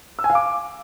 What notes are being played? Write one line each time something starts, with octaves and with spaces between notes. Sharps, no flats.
E6
G#5
F5
D6